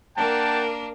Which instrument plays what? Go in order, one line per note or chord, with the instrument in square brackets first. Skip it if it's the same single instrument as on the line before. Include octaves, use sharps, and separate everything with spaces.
[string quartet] A#3 D4 A#4 [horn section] F#5 G5 A5